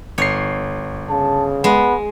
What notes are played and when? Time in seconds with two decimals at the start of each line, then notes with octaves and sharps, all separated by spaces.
0.18 G1 C#5 C7
1.10 C#3 A5
1.64 G#3 B3